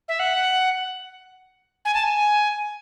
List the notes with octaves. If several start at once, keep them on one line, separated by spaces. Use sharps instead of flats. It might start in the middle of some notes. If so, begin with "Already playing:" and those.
E5
F#5
G#5
A5
G#5